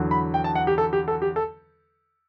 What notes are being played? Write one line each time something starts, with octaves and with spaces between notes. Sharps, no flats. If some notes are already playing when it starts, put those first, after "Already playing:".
Already playing: E2 D3 F#3
B5
G5
A5
F#5
G4
A4
G4
A4
G4
A4